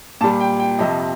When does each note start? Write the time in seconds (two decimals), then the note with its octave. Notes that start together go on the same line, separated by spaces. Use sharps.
0.21 A#2 A5
0.24 G3
0.40 G5
0.59 G5
0.79 F2 C3 F3 D#5